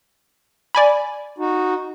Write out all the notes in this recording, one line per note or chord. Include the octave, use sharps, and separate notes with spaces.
D5 G#5 B5
D#4 F#4